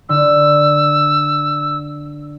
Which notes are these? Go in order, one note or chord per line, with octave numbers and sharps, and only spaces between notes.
D3 E6